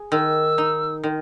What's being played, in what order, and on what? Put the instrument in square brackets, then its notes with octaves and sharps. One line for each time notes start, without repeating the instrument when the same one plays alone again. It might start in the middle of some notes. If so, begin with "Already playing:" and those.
Already playing: [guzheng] G#4
[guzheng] D#3 [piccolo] E6
[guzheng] D#4
D#3